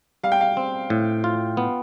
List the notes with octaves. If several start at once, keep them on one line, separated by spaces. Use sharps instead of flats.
G3 F5
G5
F5
C4
A2
F4
B3